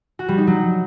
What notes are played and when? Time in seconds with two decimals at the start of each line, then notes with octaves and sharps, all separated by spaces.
0.19 F#4
0.28 G3
0.38 D#4
0.47 F#3